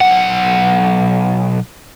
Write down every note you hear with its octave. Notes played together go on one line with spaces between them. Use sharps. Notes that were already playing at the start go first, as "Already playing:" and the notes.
B1 F#5